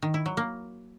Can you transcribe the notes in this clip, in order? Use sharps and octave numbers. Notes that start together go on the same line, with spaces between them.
D#3
E4
F#3
A#3